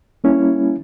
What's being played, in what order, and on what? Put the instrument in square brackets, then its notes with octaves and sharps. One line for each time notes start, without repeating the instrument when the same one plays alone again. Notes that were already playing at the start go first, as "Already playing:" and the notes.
[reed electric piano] G3 A#3 C#4 E4